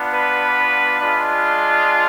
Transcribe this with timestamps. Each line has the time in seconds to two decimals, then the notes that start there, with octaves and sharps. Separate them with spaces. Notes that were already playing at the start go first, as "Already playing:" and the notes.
Already playing: B3 D4 F4
0.14 B4
1.00 G#3 D4 F4